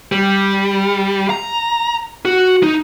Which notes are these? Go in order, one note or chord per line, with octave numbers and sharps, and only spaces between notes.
G3
A#5
F#4
D#4